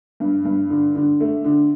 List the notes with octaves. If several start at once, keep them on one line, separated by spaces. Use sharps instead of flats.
G2
G2
D3
D3
A3
D3